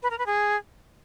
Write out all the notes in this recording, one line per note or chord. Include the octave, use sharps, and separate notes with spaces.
B4
A#4
B4
G#4